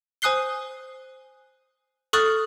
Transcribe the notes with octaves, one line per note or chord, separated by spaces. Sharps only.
C5 G#5 D#6 F#6 C7 G7
A4 C#6 D#6 F6 F#6 A6